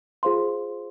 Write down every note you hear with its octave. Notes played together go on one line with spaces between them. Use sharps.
F4 G#4 C5 F5 C6